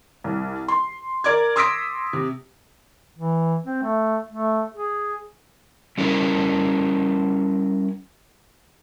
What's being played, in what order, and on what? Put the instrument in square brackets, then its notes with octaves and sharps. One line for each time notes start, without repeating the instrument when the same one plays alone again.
[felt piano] C2
C6
A#4 D5 D6 G#6
C6 D#6 E6 A#6 B6 D7
C3
[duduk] E3
C4
A3
A3
G#4
[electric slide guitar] G3 C#4 E4 A#4